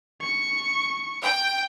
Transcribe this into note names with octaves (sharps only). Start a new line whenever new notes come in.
C#6
G5